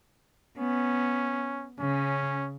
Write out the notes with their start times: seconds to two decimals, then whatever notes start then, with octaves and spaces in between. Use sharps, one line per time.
0.57 B3 C#4
1.80 C#3 C#4